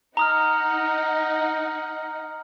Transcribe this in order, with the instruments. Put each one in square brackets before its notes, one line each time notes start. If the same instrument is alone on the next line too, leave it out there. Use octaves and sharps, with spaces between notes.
[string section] D#4 F#5 [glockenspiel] A#5 D#6 F6